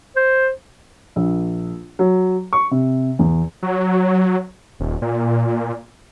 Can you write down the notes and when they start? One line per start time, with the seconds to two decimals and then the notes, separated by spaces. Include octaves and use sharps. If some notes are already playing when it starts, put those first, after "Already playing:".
0.16 C5
1.16 A#1
1.99 F#3
2.53 C#6
2.71 C3
3.19 E2
3.63 F#3
4.80 D#1
5.02 A#2